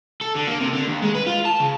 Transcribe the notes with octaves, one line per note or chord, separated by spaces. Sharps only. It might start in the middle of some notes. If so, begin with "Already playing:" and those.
A4
D3
A#3
C3
D3
D#2
G#3
B4
F4
A5
C#3